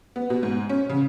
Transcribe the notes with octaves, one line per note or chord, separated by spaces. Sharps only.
B3
B2
G#2
C#4
C#3